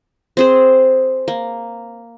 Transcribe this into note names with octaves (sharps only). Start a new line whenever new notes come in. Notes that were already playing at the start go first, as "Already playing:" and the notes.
C4 G#4 C5
A#3